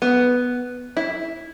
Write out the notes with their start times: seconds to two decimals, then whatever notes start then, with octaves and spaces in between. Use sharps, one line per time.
0.02 B3
0.97 E4